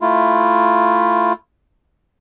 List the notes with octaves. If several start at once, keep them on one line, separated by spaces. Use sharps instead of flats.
A3 E4 F4